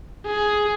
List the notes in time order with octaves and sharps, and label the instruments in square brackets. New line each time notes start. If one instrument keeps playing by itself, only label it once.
[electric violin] G#4